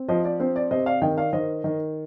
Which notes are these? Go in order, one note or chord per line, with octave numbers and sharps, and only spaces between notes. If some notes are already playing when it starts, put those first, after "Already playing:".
Already playing: C4
F3 C5 D#5
D5
C4 C5
D5
C3 C5 D#5
D5 F5
D#3 D#5 G5
D5 F5
D#3 C5 D#5
D#3